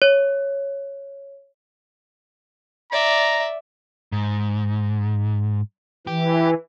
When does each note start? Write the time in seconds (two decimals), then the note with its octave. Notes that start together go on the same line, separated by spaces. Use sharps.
0.02 C#5
2.92 D5 E5 A#5
4.12 G#2
6.07 E3 G4